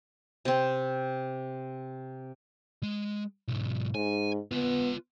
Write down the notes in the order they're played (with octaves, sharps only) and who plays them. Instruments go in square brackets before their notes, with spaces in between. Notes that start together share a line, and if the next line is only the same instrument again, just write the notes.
[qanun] C3 C4
[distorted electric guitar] G#3
B1 G#2
[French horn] G#2 [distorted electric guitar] G#5
[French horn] B3 [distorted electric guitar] F4 B4